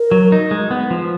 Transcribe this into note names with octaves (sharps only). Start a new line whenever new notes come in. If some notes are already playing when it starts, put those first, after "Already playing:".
Already playing: A#4
F#3
D#4
G#3
B3
F3